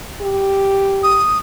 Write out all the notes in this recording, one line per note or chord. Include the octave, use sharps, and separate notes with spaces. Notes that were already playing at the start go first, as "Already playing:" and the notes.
G4
D#6